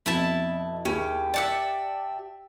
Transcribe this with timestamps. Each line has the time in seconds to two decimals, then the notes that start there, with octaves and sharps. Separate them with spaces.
0.06 F2 B2 E4 E5 A5
0.85 D#2 C#4 E4 G4 G#4
1.34 D5 E5 F#5 A5 D6